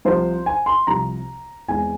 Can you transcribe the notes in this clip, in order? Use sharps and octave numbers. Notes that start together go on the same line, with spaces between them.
C2 C3 F3 C5
G#5
C6
C2 C3 F3 A#5
E2 E3 G#3 C4 G#5